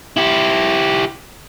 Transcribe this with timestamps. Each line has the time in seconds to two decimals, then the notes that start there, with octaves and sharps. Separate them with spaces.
0.17 E4 G4